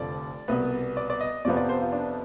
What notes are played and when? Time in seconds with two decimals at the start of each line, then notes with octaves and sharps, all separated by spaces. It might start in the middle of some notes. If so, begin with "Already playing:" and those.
Already playing: F1 D3 F3 D5
0.48 C2 B2 B3
0.97 D5
1.10 D5
1.21 D#5
1.45 F2 C3 F3 B3 D5
1.57 D5
1.69 C5
1.81 F4
1.92 D4